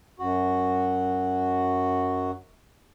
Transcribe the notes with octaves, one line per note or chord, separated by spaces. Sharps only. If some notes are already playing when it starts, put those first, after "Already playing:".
F#2 F#4